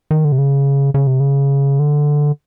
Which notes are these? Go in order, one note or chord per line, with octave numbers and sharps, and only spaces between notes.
D#3
D3
C3
C#3
C#3
C3
C#3
D3